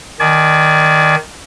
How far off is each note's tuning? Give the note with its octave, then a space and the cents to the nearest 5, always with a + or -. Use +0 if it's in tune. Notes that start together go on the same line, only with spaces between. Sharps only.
D#3 +0 D5 +0 G#5 +35